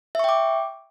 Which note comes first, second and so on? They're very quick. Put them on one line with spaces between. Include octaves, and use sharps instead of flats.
E5 C#6 G5 D6